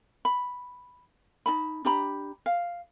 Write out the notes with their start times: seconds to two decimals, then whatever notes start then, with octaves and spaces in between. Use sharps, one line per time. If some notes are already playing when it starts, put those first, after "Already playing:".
0.25 B5
1.46 D#4 A5 B5
1.85 D4 G4 A#5 B5
2.46 F5